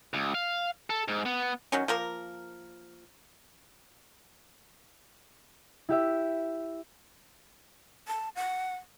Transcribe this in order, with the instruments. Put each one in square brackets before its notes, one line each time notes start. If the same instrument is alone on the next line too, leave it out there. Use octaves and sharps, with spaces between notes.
[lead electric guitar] C#2
F5
A4
G#2
B3
[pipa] D#3 F#3 C#4
F3 A#3 A#4
[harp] E4 G4 E5
[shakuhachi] A5
F#5